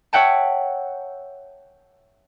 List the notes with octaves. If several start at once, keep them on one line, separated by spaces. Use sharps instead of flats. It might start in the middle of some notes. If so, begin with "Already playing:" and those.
C#5 E5 F#5 G5 A5